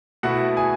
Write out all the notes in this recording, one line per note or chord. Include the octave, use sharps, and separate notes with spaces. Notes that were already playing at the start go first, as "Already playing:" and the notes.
B2 A3 E4 F#4 F#5
G#4 G#5